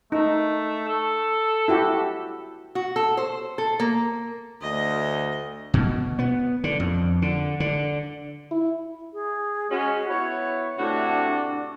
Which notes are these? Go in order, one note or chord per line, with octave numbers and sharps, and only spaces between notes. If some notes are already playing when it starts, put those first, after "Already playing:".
A3 D#4
A4
E4 F#4 G4
F#4
A4
C5
A4
A#3
D2 D#5
B2
B3
D3
F2
D3
D3
E4
G#4
G#3 C#4 F#4
B3 E4 C#5 B5
A2 C3 D4 F#4